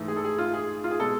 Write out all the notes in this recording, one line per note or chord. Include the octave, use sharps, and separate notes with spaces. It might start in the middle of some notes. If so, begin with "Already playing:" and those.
Already playing: G#2 E3 A3
G#4
A4
G#4
F4
G#4
F4
G#4
B2 G#3 A4